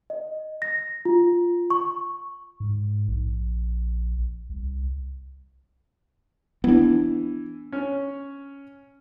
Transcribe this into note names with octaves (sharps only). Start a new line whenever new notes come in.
D#5
A#6
F4
C#6
G#2
A#1
C2
E3 B3 D4
C#4 C#5